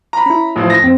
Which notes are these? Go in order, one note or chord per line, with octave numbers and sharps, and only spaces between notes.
A#5 B5
C#4 E4
A1 F3
A#6
F2 C4